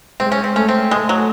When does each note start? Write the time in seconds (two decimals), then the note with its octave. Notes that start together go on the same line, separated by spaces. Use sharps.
0.20 G#3 C4
0.32 C#4
0.44 C4
0.56 A3 C#4
0.69 C4
0.91 G#3 A3
1.09 F#3